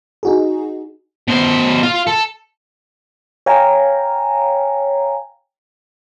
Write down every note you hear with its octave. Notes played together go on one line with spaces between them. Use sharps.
D#4 F#4 G#4
B2 C5
F4 F5
A4
C#5 F5 G5 G#5 A#5